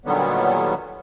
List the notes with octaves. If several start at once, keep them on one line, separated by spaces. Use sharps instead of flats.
A#2 D3 D#3 F#3 G3 B3